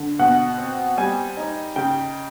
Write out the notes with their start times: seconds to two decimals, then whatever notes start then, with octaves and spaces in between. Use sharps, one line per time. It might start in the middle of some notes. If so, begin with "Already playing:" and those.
Already playing: D3
0.19 B2 F#5
0.58 C4
0.97 G3 G#5
1.37 D#4
1.76 C#3 G5